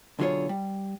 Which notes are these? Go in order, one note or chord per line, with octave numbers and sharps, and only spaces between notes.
B1 D3 F#3 F4 G#4 C#5
G3